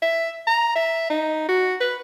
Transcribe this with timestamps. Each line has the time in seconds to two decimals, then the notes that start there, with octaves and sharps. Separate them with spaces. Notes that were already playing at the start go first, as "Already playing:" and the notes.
0.02 E5
0.47 A#5
0.75 E5
1.10 D#4
1.49 F#4
1.80 B4